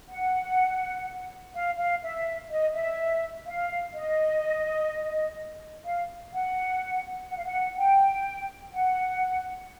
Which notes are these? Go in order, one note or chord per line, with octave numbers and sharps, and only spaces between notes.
F#5
F5
F5
E5
D#5
E5
F5
D#5
F5
F#5
F#5
F5
F#5
G5
F#5